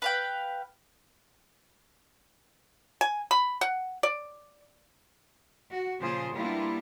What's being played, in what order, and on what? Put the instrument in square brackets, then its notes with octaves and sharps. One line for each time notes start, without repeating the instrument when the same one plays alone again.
[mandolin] B4 F5 G5
[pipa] G#5
B5
F#5
D5
[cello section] F#4
A#2 C#3 F3 F4 G#4 C5
G3 A#3 B3 D4 E4 F4